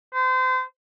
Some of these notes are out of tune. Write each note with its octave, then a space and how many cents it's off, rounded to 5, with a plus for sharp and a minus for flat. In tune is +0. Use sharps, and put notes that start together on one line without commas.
C5 -30